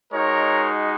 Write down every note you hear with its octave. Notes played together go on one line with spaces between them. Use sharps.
G#3 D#4 F#4 A#4 C#5